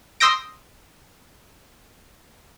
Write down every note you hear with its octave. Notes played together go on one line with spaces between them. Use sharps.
C6 D#6 E6 G6 A#6 D7